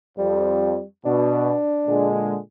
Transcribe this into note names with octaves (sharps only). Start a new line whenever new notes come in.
F2 G3
B2 D4
A#2 D3 G#3